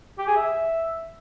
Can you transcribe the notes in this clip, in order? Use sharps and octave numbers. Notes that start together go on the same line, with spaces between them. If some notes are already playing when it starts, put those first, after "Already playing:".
G4
G#4
E5